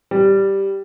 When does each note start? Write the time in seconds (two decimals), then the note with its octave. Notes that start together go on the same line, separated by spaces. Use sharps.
0.11 G3